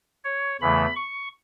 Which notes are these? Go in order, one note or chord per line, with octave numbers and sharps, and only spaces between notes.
C#5
E2 C#3 E3 A3 B5
C#6